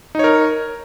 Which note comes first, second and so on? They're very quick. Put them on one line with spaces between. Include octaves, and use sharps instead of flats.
D#4 C#5 A#4